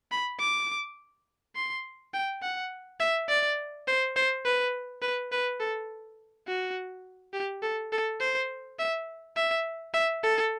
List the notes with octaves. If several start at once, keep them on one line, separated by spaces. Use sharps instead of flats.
B5
D6
C6
G5
F#5
E5
D5
C5
C5
B4
B4
B4
A4
F#4
G4
A4
A4
C5
E5
E5
E5
A4